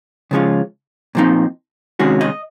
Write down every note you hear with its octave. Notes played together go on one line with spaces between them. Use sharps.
C#3 F3 G#3 C#4 F4
A#2 F3 C4 D#4
C3 D#3 G#3 C#4 F#4
D#5